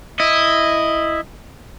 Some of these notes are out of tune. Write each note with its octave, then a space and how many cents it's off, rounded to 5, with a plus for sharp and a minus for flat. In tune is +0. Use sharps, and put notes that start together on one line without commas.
E4 +0 D#5 +0